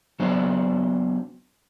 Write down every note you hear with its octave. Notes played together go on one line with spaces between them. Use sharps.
F#3 B3 D4 C5